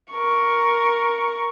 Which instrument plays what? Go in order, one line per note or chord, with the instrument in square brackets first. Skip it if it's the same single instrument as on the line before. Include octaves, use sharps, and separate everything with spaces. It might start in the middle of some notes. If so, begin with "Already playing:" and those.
[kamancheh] A#4 C#6